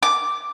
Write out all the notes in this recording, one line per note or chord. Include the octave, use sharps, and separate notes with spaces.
D6